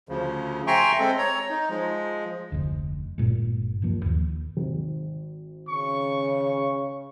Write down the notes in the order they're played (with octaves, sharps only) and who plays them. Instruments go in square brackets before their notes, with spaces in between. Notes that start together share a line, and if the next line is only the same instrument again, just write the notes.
[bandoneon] D2 C#3 F3
E5 G5 G#5 A#5 C6 C#6
G#3 C4 A4
C#5 A#5
D#4
F3 G#3
[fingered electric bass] F1 D2
G1 G2 A#2 G#3
D1 G2 F3 A#3
D#2
[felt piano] G#1
[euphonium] C#3 [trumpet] C#6